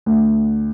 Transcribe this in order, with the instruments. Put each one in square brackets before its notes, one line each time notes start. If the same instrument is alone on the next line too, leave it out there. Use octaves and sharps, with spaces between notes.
[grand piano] D2